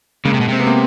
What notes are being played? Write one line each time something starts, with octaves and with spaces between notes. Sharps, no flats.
C#3 G#3 A#3
C3
B2
C3 C4
B3
A#3 C4